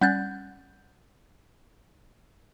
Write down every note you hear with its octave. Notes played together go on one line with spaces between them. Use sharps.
G3 C#4 F#5 F#6 G6 A6